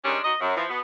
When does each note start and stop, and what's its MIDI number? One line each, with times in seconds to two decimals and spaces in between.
0.04 0.19 51
0.04 0.19 55
0.04 0.19 56
0.04 0.19 61
0.04 0.19 62
0.23 0.34 63
0.23 0.34 66
0.23 0.34 75
0.40 0.57 42
0.57 0.64 52
0.57 0.64 53
0.70 0.80 47
0.70 0.80 59